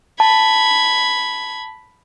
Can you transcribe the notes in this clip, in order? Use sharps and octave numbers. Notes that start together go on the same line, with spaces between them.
A5 B5 G#6